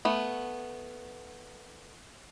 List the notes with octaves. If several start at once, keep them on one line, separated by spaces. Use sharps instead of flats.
A3 B3